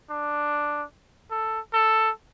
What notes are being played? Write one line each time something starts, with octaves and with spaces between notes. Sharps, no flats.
D4
A4
A4